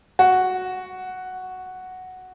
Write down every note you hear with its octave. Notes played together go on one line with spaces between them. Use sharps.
F#4